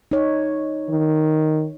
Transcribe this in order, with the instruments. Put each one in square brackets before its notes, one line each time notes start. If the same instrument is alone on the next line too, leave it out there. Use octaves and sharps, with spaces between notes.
[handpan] D#4 C#5
[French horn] D#3